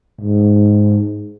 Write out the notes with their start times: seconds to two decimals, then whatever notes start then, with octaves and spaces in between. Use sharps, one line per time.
0.21 G#2